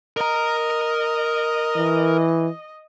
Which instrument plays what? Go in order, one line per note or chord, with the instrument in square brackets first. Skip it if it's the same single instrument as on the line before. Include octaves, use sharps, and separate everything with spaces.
[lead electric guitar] A#4 A#5 [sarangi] D#5
[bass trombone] E3